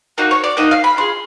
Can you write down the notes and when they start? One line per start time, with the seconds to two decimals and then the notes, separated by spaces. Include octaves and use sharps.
0.18 A#3 D#4 F#4
0.31 C#5
0.44 D5
0.57 A#3 D#4 F#4 D#5
0.71 F5
0.84 B5
0.97 D4 F4 G#4 C6